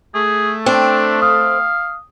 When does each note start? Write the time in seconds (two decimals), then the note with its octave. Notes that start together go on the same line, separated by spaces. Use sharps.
0.14 A3 G#4
0.66 C4 D4
1.22 F5 D#6